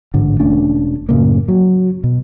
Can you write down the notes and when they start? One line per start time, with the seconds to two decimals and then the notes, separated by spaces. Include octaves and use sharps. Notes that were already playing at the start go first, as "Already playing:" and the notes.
0.14 A1 G#2 D3
0.40 E1 A3 C#4 D4
1.09 F#2 A2 C#3 A#3
1.48 F#3
2.04 B2